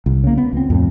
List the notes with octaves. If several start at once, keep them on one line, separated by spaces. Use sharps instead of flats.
C2
C#3 A#3
B3
C#2 C4
F2 A2